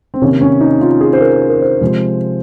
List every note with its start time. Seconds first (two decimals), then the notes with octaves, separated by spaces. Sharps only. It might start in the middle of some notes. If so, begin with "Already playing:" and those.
0.14 C4
0.21 C3 D#3 A#3 C#4
0.41 C#4
0.61 D#4
0.81 F4
1.01 G#4
1.13 C5
1.21 A#4
1.49 A#4
1.62 C5
1.81 C3 F3 G#3